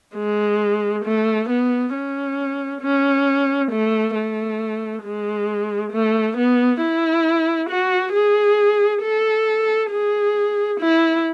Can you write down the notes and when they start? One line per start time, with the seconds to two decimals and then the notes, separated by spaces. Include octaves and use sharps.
0.16 G#3
1.05 A3
1.49 B3
1.94 C#4
2.82 C#4
3.71 A3
4.15 A3
5.03 G#3
5.92 A3
6.37 B3
6.81 E4
7.69 F#4
8.13 G#4
9.03 A4
9.91 G#4
10.80 E4